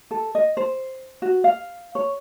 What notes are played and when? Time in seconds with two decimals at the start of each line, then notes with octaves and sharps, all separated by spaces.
0.11 A4
0.35 D#5
0.57 C5
1.22 F#4
1.44 F5
1.95 C#5